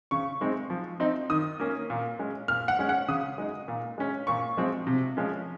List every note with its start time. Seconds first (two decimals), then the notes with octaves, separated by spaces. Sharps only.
0.11 C#3 C#6
0.41 G#3 C4 D#4
0.70 F3
1.00 C4 D#4
1.30 D#3 D#6
1.60 A#3 C#4
1.90 A#2
2.19 G#3 C#4
2.48 A#2 F6
2.68 F#5
2.79 G#3 C#4
2.89 F#5
3.08 C#3 D#6
3.38 G#3 D#4
3.68 A#2
3.98 G#3 C#4
4.27 A#2 C#6
4.57 F3 G#3 C4
4.87 C3
5.17 F3 G#3 C#4